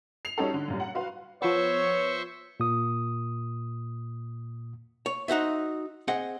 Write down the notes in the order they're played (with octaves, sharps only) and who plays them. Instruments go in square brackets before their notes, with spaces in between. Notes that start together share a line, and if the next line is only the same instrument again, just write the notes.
[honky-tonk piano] C7 F7
G3 C#4 D#4 F#4 A4
D3
F#2 A#2 G3
F#5
F#4 B4 F5 C6
[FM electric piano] F3 B3 [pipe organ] C5 E5 C#6 [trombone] C#5
[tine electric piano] A#2 D#6
[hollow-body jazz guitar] C#5
D#4 F#4 C5 E5
C4 G#4 D#5 F#5